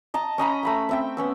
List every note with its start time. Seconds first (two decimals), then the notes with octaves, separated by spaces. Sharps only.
0.14 D#5 A5 A#5
0.38 C#4 D#5 A#5 B5
0.63 A3 B5 E6
0.89 C4 E5 G5
1.17 B3 C#4 E6